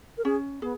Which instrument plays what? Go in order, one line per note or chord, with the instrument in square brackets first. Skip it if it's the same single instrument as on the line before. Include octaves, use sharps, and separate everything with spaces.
[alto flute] A#4
[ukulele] C#4 [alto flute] G#4
[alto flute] B3 [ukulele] G#4